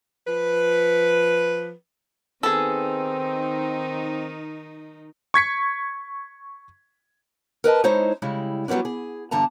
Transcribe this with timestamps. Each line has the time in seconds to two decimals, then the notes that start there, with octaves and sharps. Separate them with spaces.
0.28 F3 B4
2.43 D#3 B3 C4 D#4 G#4 A4
5.34 C#6 G#6 B6 C#7
7.64 A#4 B4 D#5 A5
7.84 G#3 D#4 E4 C5 C#5
8.22 C#3 G3 G#3 E4
8.68 F#3 G3 B3 C#4 D4
8.85 G#4
9.31 E2 G2 D3 A5 A#5